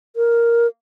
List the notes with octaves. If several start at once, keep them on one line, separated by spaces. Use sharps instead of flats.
A#4